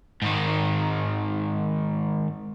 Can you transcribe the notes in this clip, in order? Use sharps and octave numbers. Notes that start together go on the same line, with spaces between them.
G#2 D#3